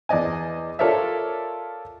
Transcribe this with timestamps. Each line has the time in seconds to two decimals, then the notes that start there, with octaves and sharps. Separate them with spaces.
0.09 E2 D5 D#5 G#5
0.79 F4 A4 A#4 C#5 D5 E5